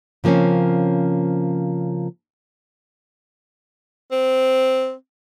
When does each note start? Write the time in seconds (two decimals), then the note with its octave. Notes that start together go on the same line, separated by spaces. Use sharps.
0.24 C#3 F3 A#3 C4 C#4
4.12 C4